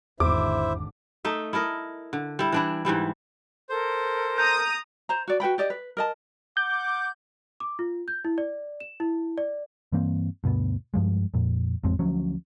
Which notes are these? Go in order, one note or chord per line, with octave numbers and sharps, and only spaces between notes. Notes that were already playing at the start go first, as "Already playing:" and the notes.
G#1 E2 D3 E4 C5 E5 D6
A3 D#4 E5
E4 A4 A#4 D#5
D3
G3 E4
E3 D4 E4
G#2 E3 G3 E4
A4 A#4 C5
A#5 D#6 G6
C5 A#5
F#4 D5
F#4 B4 G5 B5
G4 D5 D#5
B4
A#4 D#5 A5
F#5 D6 G6
D6
F4
G6
E4
D5
E7
E4
D5
G2 E3 A#3 C4
D2 G2 B2 B3
G2 F3 G#3
F2 A#2
A1 F2 G#3 C4
D2 F3 F#3 C#4